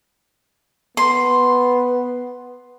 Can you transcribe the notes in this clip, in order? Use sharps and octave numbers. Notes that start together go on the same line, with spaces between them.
B3 C6